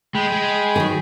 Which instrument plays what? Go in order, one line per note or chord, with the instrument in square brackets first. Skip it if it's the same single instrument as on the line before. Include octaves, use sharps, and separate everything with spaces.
[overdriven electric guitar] G#3 [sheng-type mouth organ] G5 B5
[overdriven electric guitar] G#3
[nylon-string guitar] D3 D#3 F#3